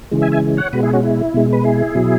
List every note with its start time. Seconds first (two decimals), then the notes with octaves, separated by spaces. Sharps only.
0.11 C#3 E3 G#3
0.22 E5 G#5
0.32 E5 G#5
0.57 C#5 F#5
0.73 B2 G#3 F#4 B4
0.83 E4 G#4
0.93 C#4 F#4
1.03 E4
1.34 B2 G#3
1.53 B4
1.64 E4 G#4
1.95 B2 F#3